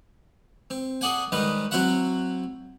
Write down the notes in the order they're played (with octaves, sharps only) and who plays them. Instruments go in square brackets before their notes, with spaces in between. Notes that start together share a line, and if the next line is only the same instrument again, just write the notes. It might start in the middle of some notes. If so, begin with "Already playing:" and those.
[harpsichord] C4
G#4 A4 D5 F#5 G#5
G#2 D#3 G3 B4 D#5
F#3 C4 E4 F#4 E5 F#5